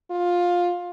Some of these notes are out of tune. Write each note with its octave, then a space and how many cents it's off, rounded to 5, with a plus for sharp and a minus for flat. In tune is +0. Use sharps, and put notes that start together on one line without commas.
F4 +15